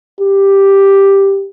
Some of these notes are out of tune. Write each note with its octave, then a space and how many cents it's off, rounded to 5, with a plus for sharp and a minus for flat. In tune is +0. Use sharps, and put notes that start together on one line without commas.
G4 +5